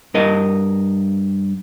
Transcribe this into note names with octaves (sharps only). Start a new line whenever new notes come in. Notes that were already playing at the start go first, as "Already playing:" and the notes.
G2 A#4 D#5